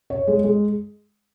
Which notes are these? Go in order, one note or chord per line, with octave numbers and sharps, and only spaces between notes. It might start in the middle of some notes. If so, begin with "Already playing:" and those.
C#5
G#3
G#3